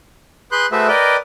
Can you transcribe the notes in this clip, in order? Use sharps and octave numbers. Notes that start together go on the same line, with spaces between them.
G#4 B4 C6 F#6 G6
A3 F#4 G#4 B4 C5 E5
A#4 B4 D5 D#5 G5